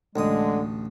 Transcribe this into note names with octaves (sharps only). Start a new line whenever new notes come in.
A1 D2 D3 G#3 D#6